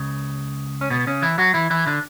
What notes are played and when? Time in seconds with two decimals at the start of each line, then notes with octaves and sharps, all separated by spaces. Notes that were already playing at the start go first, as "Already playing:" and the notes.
Already playing: C#2 C#3
0.81 C#4
0.90 B2 B3
1.07 C#3 C#4
1.22 E3 E4
1.38 F#3 F#4
1.54 E3 E4
1.70 E3 E4
1.87 D3 D4